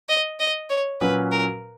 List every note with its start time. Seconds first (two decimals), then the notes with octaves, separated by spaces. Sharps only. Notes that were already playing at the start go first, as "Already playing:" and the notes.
0.09 D#5
0.39 D#5
0.69 C#5
1.00 A#2 F#3 C#4 F#4 B4
1.32 A#4